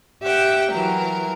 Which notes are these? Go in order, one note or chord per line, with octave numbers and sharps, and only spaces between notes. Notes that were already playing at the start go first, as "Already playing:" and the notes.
G4 E5 F#5 G5
E3 F#3 A#4